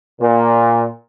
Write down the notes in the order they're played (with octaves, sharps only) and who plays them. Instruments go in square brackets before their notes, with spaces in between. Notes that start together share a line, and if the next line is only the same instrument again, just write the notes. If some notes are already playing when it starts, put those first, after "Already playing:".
[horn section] A#2